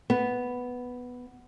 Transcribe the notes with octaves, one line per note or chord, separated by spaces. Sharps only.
B3